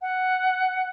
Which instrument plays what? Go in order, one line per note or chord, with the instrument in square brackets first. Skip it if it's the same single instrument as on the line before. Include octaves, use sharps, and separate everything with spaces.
[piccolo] F#5